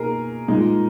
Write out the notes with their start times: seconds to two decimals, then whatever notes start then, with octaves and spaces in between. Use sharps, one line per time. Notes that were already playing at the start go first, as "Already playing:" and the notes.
Already playing: B2 A#3 D#4 G#4 A#4
0.48 A#2 G#3 D#4